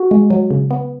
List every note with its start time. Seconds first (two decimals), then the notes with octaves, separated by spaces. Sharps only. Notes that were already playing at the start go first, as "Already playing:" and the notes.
Already playing: F#4
0.11 G#3
0.30 F#3
0.51 C#3
0.71 B3